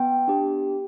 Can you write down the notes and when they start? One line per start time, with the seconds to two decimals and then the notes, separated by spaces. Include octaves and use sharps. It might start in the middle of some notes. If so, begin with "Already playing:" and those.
Already playing: B3 G5
0.28 D4 G4